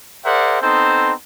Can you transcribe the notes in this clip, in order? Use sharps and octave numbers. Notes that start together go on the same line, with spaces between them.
G#4 A#4 C5 D5 E5 F#5
B3 C4 D#4 A4 C5